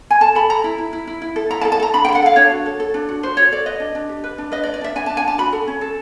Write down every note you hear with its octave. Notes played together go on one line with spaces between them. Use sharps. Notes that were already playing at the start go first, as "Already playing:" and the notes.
G#5
A4 A5
A4 B5
A4 A#5
E4
E4
E4
E4
E4
A4
E4 A#5
A5
A4
A5
A4 A#5
D4 B5
G5
A4
F#5
A4 F5
D4 C#5
F#4
A4
A4
D4
F#4
F#4 C5
F#4 C#5
A4 D5
B4 D#5
D4
D4
G4
B4
D4
B4 D#5
D5
D4
D5
D4 E5
D4 G#5
D4 A5
G#5
D4 A5
F#4 B5
A4
C#4
A4